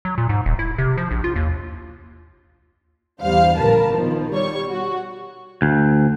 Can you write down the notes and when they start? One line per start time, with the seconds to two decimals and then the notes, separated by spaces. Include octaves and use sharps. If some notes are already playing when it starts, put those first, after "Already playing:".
0.05 F#3
0.18 A#2
0.29 G#2
0.46 D#1
0.59 E4
0.78 C3
0.97 F3
1.11 A#1
1.24 F4
1.36 D#2
3.20 E2 G2 G3 C5 F5
3.57 A#1 D3 A#4 B4 A5
3.93 B2 D#3 F3
4.31 G3 C#5 C#6
4.70 F#4
5.62 D2